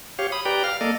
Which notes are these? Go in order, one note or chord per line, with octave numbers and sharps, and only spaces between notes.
G4 C#5 F5
B5 D#6
G4 B4 D5 G5 A#5
F5 F6
A#3 A4 D5 D#5